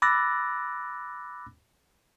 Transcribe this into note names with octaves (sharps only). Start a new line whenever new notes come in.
B5 D6 E6 F#6 A6 A#6